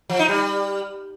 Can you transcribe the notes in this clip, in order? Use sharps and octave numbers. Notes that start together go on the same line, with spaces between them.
F3
D#4
G3